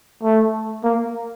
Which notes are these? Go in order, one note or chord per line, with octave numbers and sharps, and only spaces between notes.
A3
A#3